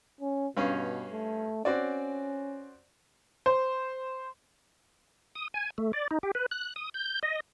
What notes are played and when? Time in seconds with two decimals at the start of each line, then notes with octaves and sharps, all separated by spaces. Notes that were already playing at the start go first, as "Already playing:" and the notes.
0.21 C#4
0.57 G2 B2 C#4 F5
1.11 A3
1.65 C4 C#4 F#4 D5
3.46 C5
5.35 D#6
5.54 G#5
5.78 A3
5.93 D5
6.11 D#4
6.23 G4
6.35 B4
6.51 F#6
6.76 D#6
6.94 G6
7.23 D#5